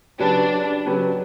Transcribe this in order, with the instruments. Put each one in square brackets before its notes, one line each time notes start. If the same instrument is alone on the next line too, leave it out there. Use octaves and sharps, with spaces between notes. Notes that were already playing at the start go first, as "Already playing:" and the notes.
[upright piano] C#3 F#3 C#4 G4 B4 [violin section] D4
[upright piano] C#3 F#3 C#4 G4 B4